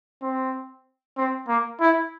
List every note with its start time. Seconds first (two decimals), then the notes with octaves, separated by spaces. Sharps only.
0.22 C4
1.17 C4
1.48 A#3
1.81 E4